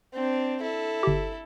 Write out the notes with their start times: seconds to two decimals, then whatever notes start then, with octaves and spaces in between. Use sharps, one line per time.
0.13 C4 D4
0.61 E4 A4
1.03 G1 G4